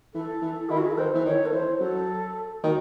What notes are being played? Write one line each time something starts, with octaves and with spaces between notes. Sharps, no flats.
E3 A4
E3
D#3 E4
F#4
G#4
A4
D#3 C5
E3
D#3 C#5
A4
E3 C5
F#3 A4
D#3 F#4